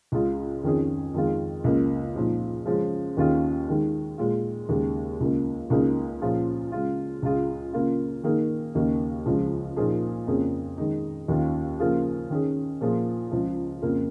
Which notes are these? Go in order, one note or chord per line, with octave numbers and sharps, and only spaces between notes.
C#2 C#3 G#3 F4 G#4
F2 D#3 C#4 G#4
F2 D#3 G#3 F4
C#2 C#3 A#3
A#2 F3 G#3 D#4 G#4
C#3 F3 G#3 C#4
D#2 D#3 C#4 F4 G#4
D#3 G#3 D#4
A#2 G#3 F4
D#2 C#3 G#3
C#2 C#3 A#3
C#2 C#3 A#3 D#4 G#4
A#2 F3 C#4 F4 G#4
C#3 G#3 F4
C#2 C#3 G#3 F4 G#4
C#3 A#3 F4
D#3 A#3 D#4 G#4
D#2 C#3 A#3 D#4
C#2 C#3 F3 G#3
A#2 F3 A#3 D#4 G#4
F2 C#3 A#3 C#4 G#4
D#3 G#3 D#4
D#2 D#3 C#4 F4
C#3 F3 A#3 F4 G#4
D#3 C#4 G#4
A#2 F3 A#3 F4 G#4
C#2 C#3 F3
F2 C#3 A#3